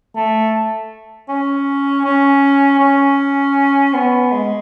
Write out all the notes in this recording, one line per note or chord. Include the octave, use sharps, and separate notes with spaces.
A3
C#4
C#4
C#4
B3
G#3